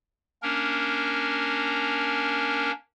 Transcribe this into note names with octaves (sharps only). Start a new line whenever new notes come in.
A#3 C#4 D4 A#4